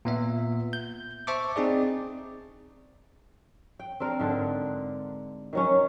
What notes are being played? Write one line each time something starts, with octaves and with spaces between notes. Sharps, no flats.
A#2 B3 E5
G6
C5 E5 A5 C#6 D6
C4 D#4 G#4 D5
G5
C4 D4 A#4
G#2 D3 D4
D#3 F#3 C#4